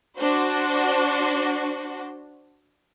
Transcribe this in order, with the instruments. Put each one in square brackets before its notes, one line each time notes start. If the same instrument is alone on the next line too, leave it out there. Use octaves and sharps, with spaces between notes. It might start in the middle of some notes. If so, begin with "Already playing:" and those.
[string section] D4 F#4 C5